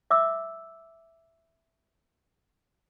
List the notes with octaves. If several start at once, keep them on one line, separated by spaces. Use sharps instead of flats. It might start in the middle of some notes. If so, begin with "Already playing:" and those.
E5 D6 E6